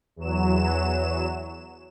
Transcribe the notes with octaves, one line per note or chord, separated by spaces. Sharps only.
E2 F#3 E7